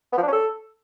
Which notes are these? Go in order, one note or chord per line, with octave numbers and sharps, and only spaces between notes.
B3
F3
D4
C#4
A4